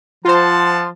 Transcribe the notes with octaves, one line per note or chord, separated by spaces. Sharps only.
F3 F4 C5 F#5 A5 C6